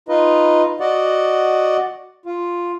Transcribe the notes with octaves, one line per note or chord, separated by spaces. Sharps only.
D#4 F4 B4 D#5
F#4 D5 D#5 F#5
F4